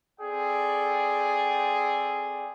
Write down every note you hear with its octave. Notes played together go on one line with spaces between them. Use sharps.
C4 G#4 A4 D5 G5